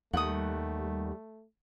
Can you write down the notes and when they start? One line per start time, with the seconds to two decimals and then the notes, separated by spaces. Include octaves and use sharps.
0.13 D#2 G3 A3 F#5 D#6